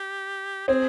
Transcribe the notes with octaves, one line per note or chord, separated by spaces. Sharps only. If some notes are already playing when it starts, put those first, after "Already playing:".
Already playing: G4
C4 G#4